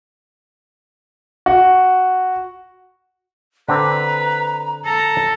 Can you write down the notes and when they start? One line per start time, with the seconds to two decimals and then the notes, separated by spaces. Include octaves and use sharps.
1.46 F#4
3.69 D3 C4 B4 A#5
4.86 A4 A#5